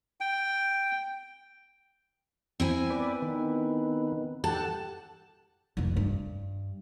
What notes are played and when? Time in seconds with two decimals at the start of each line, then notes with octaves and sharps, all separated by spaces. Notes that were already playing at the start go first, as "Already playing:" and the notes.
0.20 G5
2.60 C4 E4 G#5
2.90 B4 D5
3.22 D#3 B3
4.44 G4 A4 F#5 A5
5.77 F1 D#2
5.96 G2